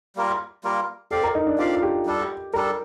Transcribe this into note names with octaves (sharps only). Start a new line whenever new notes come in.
G3 A#3 F4 A#4
G3 A#3 F4 A#4
C4 G4 A4 D5 F5
A#4
D#4
D4
C4 F4 G4 D5 F5
F4
G4
G3 D4 A4
G3 D4 A4 A#4